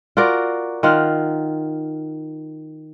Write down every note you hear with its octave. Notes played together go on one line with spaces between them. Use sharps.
F4 F#4 A#4 D5
D#3 F4 F#5